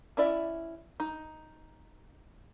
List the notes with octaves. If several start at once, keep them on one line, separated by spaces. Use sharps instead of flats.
C#4 E4 D5 E5
D#4